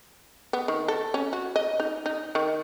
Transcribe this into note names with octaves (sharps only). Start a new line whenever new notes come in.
B3
D#3
A4
C#4
F#4
D#5
D#4
D#4
D#3